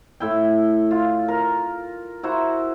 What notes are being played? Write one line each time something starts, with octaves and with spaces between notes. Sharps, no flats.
A2 E4 G5
F4
A#4
E4 F#4 C5 A#5